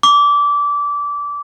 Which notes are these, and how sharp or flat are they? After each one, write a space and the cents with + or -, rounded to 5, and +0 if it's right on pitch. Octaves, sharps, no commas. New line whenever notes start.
D6 -20